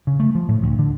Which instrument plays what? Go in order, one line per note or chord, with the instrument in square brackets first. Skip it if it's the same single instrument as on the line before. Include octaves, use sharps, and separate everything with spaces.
[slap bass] C#3
A3
F3
A2
D2
D3